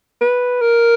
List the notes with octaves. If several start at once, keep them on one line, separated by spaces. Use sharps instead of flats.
B4
A#4